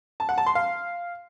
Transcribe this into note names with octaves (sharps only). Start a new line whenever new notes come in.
A5
F#5
A5
C6
F5